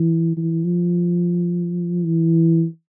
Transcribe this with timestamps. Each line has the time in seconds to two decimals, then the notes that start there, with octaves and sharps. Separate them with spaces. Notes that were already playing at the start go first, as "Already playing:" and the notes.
Already playing: E3
0.37 E3
0.64 F3
2.05 E3